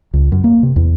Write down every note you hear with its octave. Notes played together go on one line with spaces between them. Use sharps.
C#2
F#2
A#3
C3
E2